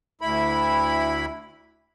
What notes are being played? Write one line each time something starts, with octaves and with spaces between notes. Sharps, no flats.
D2 E4 B5